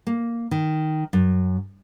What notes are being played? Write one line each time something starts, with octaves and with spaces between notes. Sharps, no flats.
A#3
D#3
F#2